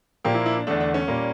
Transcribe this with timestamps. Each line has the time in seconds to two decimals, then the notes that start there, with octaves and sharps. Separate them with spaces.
0.25 A#2 F3 A#3 G4
0.35 E4
0.46 E4
0.56 D4
0.67 E2 D3 A3 D4
0.80 D4
0.94 C#4
1.08 A#2 G3 A#3